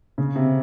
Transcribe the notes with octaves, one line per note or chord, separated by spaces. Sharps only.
C#3
C3